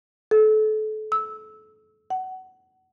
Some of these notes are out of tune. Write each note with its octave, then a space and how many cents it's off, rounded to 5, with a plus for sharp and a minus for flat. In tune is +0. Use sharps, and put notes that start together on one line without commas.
A4 -30
E6 -15
F#5 +20